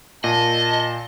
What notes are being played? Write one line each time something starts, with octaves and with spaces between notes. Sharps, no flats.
A#2 D#5 A5